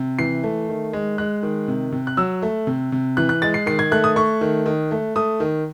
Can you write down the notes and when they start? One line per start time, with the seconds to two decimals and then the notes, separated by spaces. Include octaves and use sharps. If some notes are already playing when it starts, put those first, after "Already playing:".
Already playing: C3
0.19 E3 C7
0.43 A3
0.69 D#3
0.93 G#3
1.18 G#3 F#6
1.43 D#3
1.68 C3
1.92 C3
2.07 F#6
2.17 F#3 E6
2.42 A3
2.67 C3
2.92 C3
3.17 E3 F#6
3.29 F#6
3.42 G#3 A6
3.54 C7
3.66 D#3 C7
3.79 G#6
3.91 A3 F#6
4.04 D#6
4.16 A3 C#6
4.41 D#3
4.66 D#3
4.91 A3
5.16 A3 D#6
5.40 D#3